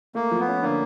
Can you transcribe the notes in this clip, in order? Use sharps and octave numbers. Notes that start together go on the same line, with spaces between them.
A3 A#3
F3
B3
C#4
D3 A#3